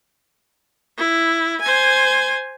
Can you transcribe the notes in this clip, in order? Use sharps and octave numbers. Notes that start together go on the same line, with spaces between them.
E4
C5 G#5